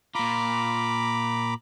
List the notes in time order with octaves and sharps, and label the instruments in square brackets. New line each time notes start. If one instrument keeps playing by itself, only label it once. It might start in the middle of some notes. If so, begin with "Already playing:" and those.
[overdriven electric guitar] A#2 F4 [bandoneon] A#5 B5 D6